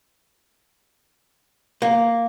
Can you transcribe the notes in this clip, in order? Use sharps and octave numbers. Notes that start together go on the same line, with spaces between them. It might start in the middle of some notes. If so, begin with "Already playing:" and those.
A#3